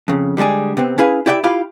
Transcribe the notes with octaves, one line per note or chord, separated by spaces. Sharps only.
F2 C#3
D3 G3 G#3 D4 G#4
C3 B3 C4
C#4 E4 G#4 B4 F5 G#5
E4 G4 D5 E5 F#5 G5
E4 F4 G4 F5 B5